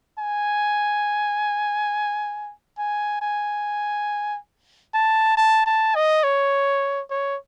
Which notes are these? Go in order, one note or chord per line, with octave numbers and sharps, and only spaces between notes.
G#5
G#5
G#5
A5
A5
A5
D#5
C#5
C#5